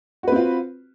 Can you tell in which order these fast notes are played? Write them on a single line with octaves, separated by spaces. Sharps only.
F#4 B4 C4 F4